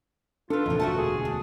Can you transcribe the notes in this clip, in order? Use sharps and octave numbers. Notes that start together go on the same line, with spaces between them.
D4 F4 A4 B4
A1 E2 C3 D#3 F3
E1 D2 A3 F#4 F#5 A5
G#4
D4